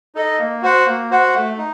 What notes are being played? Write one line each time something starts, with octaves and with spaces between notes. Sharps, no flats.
D#4 A4 D#5
A#3
F#4 C5 F#5
A#3
F#4 C5 F#5
A3
D#4